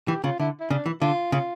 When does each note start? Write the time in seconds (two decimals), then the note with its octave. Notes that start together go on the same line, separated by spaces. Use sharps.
0.08 E3 G4
0.24 C#3 F4
0.40 D3 E4
0.60 E4
0.70 C#3 D4
0.86 E3
1.01 D3 F4
1.32 C#3 F4